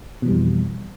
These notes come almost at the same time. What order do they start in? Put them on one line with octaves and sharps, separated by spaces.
B2 E3 G3 F2